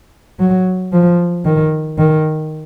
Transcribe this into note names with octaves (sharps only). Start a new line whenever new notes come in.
F#3
F3
D#3
D#3